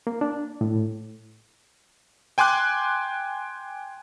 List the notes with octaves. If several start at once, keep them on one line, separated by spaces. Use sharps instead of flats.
A#3
D4
A2
G5 G#5 C6 D6 F#6